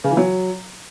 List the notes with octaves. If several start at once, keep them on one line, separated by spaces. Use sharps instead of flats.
C#3
E3
F#3